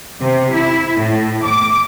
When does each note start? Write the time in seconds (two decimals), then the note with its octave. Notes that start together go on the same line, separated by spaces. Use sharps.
0.23 C3
0.53 E4
0.98 A2
1.45 D6